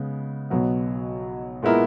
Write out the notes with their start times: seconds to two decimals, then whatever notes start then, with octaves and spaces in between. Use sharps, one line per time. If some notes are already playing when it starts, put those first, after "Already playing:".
Already playing: C#3 G#3 B3
0.50 B1 B2 F#3 B3
1.62 A#2 G#3 B3 E4 A#4